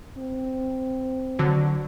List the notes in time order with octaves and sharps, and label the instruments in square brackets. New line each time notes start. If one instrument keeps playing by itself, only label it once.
[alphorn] C4
[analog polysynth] D3 F#3